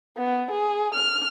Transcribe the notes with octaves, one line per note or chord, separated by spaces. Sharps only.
B3
G#4
F6